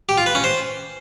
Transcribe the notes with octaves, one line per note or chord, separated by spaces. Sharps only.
G4
F4
B4
C#4
C5